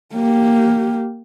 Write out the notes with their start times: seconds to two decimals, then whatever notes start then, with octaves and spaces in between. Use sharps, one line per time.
0.15 A#3 G4